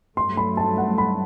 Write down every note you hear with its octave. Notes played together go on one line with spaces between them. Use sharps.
G2 F#3 A3 C6
B5
A5
F#5
B5